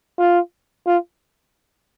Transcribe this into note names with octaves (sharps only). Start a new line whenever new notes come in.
F4
F4